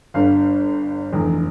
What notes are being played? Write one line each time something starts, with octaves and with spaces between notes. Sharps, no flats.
G1 G2 D3 F5
F1 E2 D3